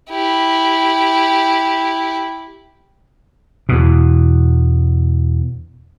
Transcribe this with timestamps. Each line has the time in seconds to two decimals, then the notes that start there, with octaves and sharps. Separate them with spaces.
0.10 E4 G4
3.69 E2 B2